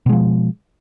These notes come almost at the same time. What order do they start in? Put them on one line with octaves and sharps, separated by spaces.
B2 G#3 F3